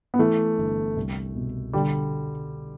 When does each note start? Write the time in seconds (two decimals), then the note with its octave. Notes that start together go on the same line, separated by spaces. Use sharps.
0.14 B3
0.19 E3 A3
0.58 G1
0.97 C2
1.35 B2
1.73 D3 G3